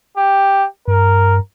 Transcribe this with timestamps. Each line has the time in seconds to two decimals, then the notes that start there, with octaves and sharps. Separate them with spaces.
0.17 G4
0.88 G2 A#4